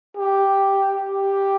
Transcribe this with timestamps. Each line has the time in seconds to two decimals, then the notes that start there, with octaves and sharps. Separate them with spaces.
0.17 G4
1.09 G4